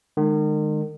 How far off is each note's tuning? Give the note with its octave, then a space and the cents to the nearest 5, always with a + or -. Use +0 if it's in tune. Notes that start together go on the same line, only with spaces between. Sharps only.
D#3 -40 G#3 -5